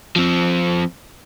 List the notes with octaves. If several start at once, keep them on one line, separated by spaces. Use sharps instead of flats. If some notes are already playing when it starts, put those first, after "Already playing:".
F3 C4